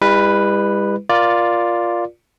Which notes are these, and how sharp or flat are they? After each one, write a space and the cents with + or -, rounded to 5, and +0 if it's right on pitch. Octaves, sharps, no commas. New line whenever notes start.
G3 +45 E4 +0 B4 +0
F4 +0 A#4 +20 D5 +0